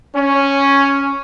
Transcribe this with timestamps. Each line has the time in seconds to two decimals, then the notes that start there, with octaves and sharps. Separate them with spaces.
0.15 C#4